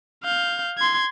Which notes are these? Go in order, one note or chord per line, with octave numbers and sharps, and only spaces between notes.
F5 G6
C6 G#6